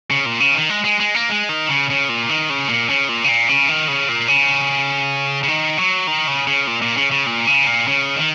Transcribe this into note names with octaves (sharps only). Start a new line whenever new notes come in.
C#3
A#2
C#3
D#3
G#3
G#3
G#3
A#3
G#3
D#3
C#3
C#3
A#2
D#3
C#3
A#2
C#3
A#2
C#3
A#2
C#3
D#3
C#3
A#2
C#3
C#3
D#3
F#3
D#3
C#3
C#3
A#2
A#2
C#3
C#3
A#2
C#3
A#2
C#3
D#3